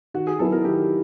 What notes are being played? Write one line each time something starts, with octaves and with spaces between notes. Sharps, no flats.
D#3 F#4
G#4
F#3 B3 E4 A4
A#4
D#3 G4